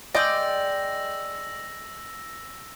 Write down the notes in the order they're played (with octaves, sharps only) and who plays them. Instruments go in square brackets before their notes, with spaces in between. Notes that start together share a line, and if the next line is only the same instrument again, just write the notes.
[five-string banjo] G#3 D#5 [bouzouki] D5 G5 [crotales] E6 A#6